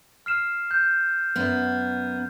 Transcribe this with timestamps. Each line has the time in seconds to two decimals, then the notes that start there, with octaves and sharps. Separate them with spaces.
0.26 F6 C7 E7
0.71 G6
1.36 F#2 B3